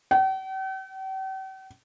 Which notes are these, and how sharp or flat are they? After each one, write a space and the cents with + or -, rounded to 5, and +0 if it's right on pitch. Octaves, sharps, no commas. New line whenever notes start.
G5 -45